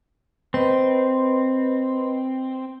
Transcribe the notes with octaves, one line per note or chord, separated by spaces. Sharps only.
C4 B4 D#5 B5